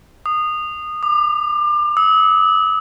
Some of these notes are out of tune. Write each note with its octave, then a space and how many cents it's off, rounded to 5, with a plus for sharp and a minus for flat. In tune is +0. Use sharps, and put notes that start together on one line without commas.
D#6 -20
D6 +30
E6 -40